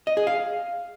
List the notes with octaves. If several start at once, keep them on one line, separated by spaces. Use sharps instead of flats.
D#5
G#4
F5